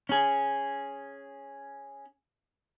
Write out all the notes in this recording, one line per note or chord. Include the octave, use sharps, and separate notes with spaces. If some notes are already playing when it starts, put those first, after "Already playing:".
C#4 G#4